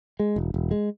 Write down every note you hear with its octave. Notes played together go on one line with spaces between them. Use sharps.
G#3
E1
E1
G#3